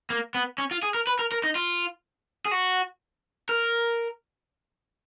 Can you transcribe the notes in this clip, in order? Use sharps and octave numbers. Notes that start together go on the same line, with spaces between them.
A#3
B3
C#4
F4
G#4
A#4
B4
A#4
A#4
D#4
F4
G#4
F#4
A#4